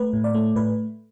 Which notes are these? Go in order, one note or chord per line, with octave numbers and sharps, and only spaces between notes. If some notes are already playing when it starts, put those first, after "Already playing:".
Already playing: A3 B4
A2
D5
A3
A2 B4